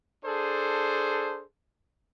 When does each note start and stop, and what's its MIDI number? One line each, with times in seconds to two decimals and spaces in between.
0.25 1.43 62
0.25 1.43 68
0.25 1.43 69
0.25 1.43 72